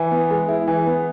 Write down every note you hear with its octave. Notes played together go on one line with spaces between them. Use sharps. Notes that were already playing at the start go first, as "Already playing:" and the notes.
Already playing: E3
B3
G#3
E4
E3
B3